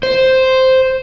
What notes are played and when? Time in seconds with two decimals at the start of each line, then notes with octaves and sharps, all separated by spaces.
0.03 C5